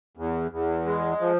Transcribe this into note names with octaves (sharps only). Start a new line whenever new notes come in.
E2
E2
G#3
F3